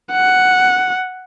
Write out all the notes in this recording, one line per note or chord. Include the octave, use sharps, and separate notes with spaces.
F#5